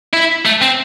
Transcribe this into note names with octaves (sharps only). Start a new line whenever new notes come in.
E4
A3
C4